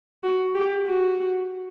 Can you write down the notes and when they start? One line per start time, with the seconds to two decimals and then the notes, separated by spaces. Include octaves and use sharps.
0.24 F#4
0.55 G4
0.87 F#4